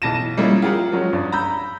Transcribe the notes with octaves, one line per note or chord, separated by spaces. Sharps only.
B1 E3 A5 A#6 D#7 E7
F3 G3 G#3 A#3 C#4 E4
F4 G4 G#4 A#4 F5 F#5
F3 F#3 G#3 C#4
G2 D5 D#6
A#5 B5 E6 G6